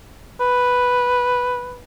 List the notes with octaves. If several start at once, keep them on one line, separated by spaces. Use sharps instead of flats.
B4